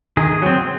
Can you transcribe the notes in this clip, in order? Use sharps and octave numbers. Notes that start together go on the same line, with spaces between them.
D#3 G#4
F#3 C4